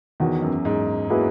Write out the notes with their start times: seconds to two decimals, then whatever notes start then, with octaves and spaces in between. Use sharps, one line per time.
0.20 E2 D#3 F#3 B3 F#4
0.42 F#2
0.65 G#2
1.10 F#3 A#3 E4 G#4 B4